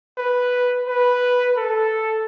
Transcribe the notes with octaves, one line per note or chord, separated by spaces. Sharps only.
B4
B4
A4